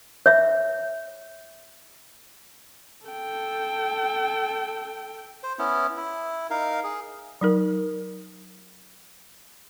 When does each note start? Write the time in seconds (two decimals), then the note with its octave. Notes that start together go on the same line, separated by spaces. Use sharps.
0.26 C#5 E5
3.08 A4 G5
5.43 C5
5.59 B3 C#4 E4
5.97 E4
6.50 D#4 A#4 F5
6.84 G#4
7.41 F#3 D#4 A#4